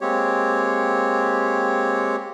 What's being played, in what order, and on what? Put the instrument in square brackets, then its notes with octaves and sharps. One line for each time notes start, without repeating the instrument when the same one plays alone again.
[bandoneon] G#3 A#3 C4 G4 C#5